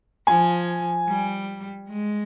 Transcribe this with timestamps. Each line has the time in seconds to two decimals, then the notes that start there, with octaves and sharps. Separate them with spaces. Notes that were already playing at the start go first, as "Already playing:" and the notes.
0.27 F3 G#5
1.08 G3
1.88 G#3